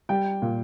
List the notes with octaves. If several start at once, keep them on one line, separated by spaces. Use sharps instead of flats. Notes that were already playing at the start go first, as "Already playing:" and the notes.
G3 G5
A#2